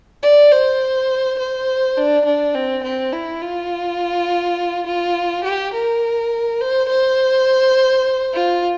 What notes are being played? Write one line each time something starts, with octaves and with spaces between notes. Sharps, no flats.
D5
C5
C5
D4
D4
C4
C4
E4
F4
F4
G4
A#4
C5
C5
F4